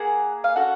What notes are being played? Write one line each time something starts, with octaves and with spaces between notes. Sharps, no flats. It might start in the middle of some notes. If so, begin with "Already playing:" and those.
Already playing: A#3 G#4 F#5
F5
C#4 F#4 A4 F#5